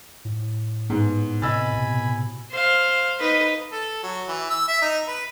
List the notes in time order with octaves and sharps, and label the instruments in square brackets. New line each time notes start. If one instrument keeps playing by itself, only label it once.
[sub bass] A2
[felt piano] G#2 [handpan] B3
[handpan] C3 [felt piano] D#5 E6 A6 [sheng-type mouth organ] G#5 B5
[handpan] B2
[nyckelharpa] C5 F5
D#4 B4
[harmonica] A4
F#3
E3
E6
E5
D#4
B4